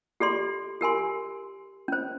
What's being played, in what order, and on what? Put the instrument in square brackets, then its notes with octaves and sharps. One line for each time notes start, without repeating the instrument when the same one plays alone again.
[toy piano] G4 A4 D5 C6
G4 A#4 G#5 C6
C#4 C5